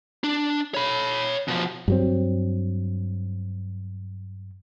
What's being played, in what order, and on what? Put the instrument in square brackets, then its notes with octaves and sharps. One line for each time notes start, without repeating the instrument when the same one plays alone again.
[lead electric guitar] D4
C#5 B5
B2 F3
[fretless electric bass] G2 F#3 C4